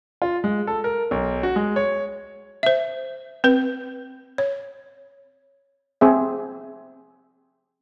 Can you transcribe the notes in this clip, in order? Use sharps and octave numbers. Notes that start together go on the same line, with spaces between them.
F4
G#3
A4
A#4
B1
F#4
G#3
C#5
C5 E5
C4 B4
C#5
C4 G#4 E5